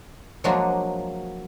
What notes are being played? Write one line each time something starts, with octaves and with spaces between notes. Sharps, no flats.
F3 F#3 G#3 A#3 D4 F#4